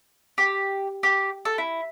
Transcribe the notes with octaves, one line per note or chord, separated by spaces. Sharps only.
G4
G4
A4
E4